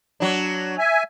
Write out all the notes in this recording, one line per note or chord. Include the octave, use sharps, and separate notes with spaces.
F#3 D4
E5 G#5